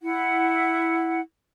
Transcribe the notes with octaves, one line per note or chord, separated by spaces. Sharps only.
E4 F#5